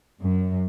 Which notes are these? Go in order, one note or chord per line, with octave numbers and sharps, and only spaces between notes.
F#2